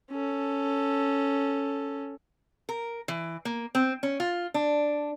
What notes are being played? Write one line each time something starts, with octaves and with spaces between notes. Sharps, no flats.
C#4 A4
A#4
E3
A#3
C4
C#4
F4
D4